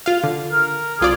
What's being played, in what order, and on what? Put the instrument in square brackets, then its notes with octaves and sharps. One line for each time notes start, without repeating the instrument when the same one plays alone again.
[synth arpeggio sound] F4 F5
D3
[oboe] A#4
[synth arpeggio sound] C2 F4 D5 [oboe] G#4